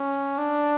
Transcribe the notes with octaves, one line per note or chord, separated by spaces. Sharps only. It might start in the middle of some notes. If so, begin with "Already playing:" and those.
Already playing: C#4
D4